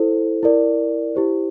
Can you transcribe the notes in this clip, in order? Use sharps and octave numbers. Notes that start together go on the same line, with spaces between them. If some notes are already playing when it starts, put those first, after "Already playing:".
Already playing: E4 A4 C5
E4 A#4 D5
E4 G4 C5